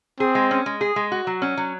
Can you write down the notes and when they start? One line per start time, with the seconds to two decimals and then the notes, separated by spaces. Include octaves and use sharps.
0.20 C4 G#4
0.35 G#3
0.51 C#4
0.66 G#3
0.81 G#4
0.96 G#3
1.12 F#4
1.27 F#3
1.42 C#4
1.57 F#3